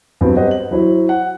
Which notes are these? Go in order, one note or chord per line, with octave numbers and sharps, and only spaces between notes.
G2 F#3 B3 C4
G4 B4 C5 D#5 F#5
F#7
F#3 E4 C5
F#5